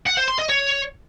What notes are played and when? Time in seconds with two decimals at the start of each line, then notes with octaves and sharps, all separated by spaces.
0.06 F#5
0.17 C5
0.28 C6
0.39 D#5
0.49 C#5